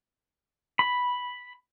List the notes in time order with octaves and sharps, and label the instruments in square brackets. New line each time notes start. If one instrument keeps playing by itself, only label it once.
[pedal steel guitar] B5